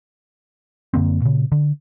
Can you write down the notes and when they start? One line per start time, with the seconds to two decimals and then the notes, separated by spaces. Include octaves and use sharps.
0.94 F#2 D3 A#3 C4
1.22 A#2 C#3
1.52 D3